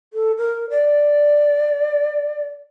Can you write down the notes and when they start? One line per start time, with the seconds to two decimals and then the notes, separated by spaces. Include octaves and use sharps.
0.13 A4
0.38 A#4
0.70 D5